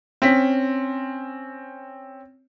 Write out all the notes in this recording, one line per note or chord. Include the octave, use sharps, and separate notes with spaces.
C4 C#4 B6